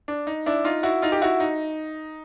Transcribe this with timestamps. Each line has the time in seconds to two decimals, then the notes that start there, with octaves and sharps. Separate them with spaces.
0.08 D4
0.27 D#4
0.46 D4 E4
0.65 D#4 F4
0.83 E4 F#4
1.02 D#4 F4
1.12 G4
1.22 E4 F#4
1.40 D#4